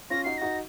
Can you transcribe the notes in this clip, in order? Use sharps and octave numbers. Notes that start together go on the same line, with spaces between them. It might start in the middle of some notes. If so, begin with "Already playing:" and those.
C#4 F4 A#6
D#4 F#4 C7
D#4 F#4 A#6